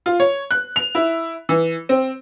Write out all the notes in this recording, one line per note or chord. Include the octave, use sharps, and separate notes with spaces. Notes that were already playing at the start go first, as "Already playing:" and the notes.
F4
C#5
F#6
F7
E4
E3
C4